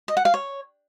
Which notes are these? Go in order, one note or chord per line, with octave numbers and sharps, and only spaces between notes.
D#5
F#5
F5
C#5